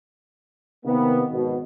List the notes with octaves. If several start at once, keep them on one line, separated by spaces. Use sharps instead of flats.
C3 D#3 A#3 B3
G#1 B2